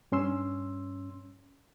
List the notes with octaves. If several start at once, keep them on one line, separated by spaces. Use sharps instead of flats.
G2 C#4 C6 E6